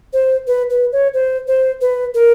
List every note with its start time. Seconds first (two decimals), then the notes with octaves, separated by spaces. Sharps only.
0.13 C5
0.47 B4
0.70 B4
0.92 C#5
1.14 C5
1.47 C5
1.81 B4
2.14 A#4